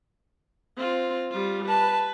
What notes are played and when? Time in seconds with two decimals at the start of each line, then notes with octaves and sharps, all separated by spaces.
0.77 C4 F4
1.31 G3 F4
1.68 B4 A5